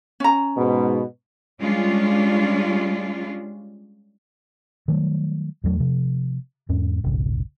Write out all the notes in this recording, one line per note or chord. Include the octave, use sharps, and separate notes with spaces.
C#4 A#5
G#2 B2
G3 G#3 C#4 D4 F4
D#3 F#3 G3 A3
E2 G2 F#3 A3
C3 F3
E2 G#2 C#4
F1 B1 G#2 C#3